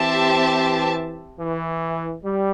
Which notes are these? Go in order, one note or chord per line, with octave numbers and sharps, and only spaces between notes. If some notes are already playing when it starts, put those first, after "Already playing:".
Already playing: E3 C4 G4 C5 E5 A5
E3
G3